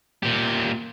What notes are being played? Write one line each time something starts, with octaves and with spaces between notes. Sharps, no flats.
A#2 G4